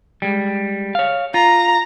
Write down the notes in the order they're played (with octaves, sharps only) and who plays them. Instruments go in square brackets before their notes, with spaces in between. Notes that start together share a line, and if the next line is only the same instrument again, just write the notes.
[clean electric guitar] G3 G#3
C#5 F5
[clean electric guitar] F4 [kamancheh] A#5